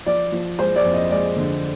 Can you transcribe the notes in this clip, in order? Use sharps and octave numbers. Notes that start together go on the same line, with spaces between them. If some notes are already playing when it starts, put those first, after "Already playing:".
F3 D5
F3
G#3 C5
D5
F2
D#5
G#3 D5
D3